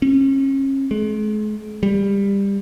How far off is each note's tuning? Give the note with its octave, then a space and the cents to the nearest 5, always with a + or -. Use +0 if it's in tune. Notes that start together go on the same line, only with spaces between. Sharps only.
C#4 -35
G#3 +40
G3 +20